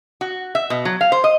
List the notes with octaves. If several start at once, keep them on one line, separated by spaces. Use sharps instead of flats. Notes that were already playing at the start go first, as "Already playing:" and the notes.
F#4
E5
B2
F#3
F5
C5
D#5